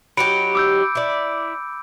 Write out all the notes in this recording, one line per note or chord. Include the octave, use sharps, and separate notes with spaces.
F#3 D#4 G4 B5 C#7 D7
D6 E6 G6
E4 D5